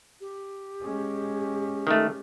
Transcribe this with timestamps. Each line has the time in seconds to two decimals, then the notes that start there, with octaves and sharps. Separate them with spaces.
0.21 G4
0.81 G#3 C#4
1.87 D#3 A3